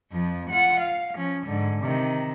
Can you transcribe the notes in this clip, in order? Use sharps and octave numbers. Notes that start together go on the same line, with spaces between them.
F2 F3
F4 F#5
F5
F3 C#4
G#2 D3
C3 D#3